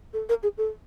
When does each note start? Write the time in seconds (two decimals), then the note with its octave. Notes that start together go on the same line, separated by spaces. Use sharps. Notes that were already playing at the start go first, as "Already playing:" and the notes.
0.13 A4
0.29 A#4
0.43 G#4
0.58 A4